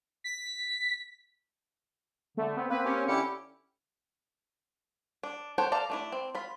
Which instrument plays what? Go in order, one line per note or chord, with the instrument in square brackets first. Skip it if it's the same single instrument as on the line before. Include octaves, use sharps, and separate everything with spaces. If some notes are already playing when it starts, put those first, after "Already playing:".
[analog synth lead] B6
[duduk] D3 [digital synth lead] A3
[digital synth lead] B3 [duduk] C4
[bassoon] A#3 [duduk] C4 [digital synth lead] B4
[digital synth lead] C#4 [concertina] G4
[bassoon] D3 [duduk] C#4 [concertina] E4 G4 [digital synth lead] C#7
[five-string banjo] D4
A4 C5 C#5 F#5 G5
A4 D5 F5 A#5
A3 D4 E4
C4
F4 B5